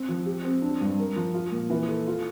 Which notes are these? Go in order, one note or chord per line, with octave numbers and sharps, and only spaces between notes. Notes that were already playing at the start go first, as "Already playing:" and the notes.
Already playing: C4
F3
G4
C4
D4
G2
A#4
F3
F4
A#2
E3
A4
F4